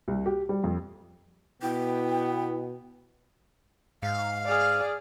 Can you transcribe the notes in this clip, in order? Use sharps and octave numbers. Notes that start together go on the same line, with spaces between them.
C2
G4
G3
F2
B2 B3 E4 G5
G#2 F5
G#4 D5 G#5 D#6 F6